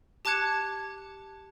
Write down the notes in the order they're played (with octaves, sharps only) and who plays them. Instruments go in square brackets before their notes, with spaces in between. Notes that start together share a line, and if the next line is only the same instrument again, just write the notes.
[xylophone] G4 A5 D6 F#6 G#6 C#7